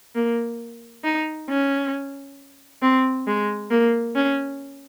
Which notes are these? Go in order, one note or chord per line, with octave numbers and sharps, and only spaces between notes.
A#3
D#4
C#4
C4
G#3
A#3
C#4